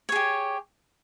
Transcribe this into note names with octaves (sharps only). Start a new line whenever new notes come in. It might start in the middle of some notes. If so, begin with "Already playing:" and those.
G4 G#4 C#5